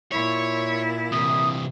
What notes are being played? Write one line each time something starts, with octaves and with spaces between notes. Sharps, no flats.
A#2 E4 C#5
C3 E3 D#6